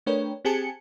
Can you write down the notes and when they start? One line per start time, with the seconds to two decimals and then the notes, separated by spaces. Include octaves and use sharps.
0.06 A3 D4 A#4 B4 C#5 G5
0.45 C4 G4 G#4 G#5 A5 C#7